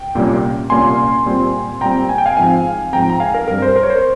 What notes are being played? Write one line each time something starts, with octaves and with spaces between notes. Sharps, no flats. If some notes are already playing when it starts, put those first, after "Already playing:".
Already playing: G5
C2 A#2 G3 A#3 C#4
C2 A#2 G3 A#3 C#4 G#5 C6
A#2 G3 C4
A#2 G3 C4 G5 A#5
G#5
G5
F5 G#5
G#2 F3 C4 F5 G#5
G#2 F3 C4 G5 A#5
A#5
F5 G#5
A#4
G2 G3 C4 A#4
C5
A#4
C#5
C5